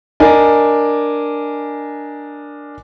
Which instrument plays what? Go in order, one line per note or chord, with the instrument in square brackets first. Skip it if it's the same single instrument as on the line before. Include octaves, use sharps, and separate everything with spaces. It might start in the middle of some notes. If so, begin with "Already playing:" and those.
[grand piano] D4 A#4 D#5 G#5